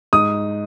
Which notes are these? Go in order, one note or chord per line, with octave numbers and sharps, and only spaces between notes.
G#2 D#6